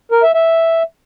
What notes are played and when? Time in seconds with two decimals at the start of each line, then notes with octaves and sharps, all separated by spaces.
0.12 A#4
0.23 E5
0.34 E5